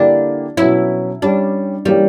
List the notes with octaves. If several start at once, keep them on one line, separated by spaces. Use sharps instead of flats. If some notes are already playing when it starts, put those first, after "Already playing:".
Already playing: D3 A#3 D4 E4 G4
B2 F#3 C#4 E4
G3 C#4 D4 G4
E3 G3 A#3 C#4 G4